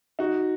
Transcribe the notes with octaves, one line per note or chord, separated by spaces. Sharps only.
D#4 F#4